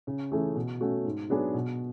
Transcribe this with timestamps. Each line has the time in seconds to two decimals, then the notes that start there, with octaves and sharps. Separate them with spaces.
0.07 C#3
0.31 E3 A3 C#4 G#4
0.55 B2
0.80 A3 C#4 F#4
1.05 G#2
1.30 F#3 B3 D4 G#4
1.54 B2